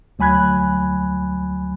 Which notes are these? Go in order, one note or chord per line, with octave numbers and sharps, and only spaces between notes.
D2 F#3 G#5 B5 F#6 G#6